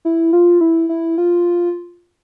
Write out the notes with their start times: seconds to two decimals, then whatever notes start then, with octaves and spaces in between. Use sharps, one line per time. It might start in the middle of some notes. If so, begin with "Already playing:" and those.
0.05 E4
0.33 F4
0.61 E4
0.89 E4
1.18 F4